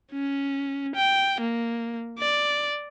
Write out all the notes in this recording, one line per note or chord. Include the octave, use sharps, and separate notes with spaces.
C#4
G5
A#3
D5